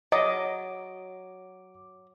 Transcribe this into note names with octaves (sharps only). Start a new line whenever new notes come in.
F#3 D#5 D6